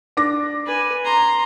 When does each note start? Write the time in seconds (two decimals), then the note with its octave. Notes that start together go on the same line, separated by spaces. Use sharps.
0.17 D4 D6 A#6
0.66 B4 G#5
1.04 A#5 C6